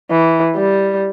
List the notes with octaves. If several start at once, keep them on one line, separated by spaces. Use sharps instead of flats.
E3
G3